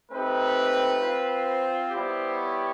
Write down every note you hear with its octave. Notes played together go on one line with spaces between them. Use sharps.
A3 C4 D#4 G4 B4
C4 F4
C5
G3 B3 E4 G4
C#5